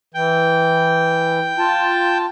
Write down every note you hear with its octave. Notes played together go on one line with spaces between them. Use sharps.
E3 G5
F4 A5